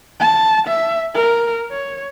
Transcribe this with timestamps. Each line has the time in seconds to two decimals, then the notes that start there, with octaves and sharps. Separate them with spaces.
0.20 A5
0.68 E5
1.14 A#4
1.71 C#5